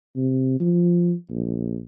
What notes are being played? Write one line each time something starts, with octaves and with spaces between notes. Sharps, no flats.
C3
F3
A#1